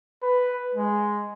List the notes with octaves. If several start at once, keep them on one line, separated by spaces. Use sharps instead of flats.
B4
G#3